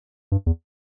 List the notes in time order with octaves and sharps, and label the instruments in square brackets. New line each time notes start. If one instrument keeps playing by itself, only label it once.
[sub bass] G2
E2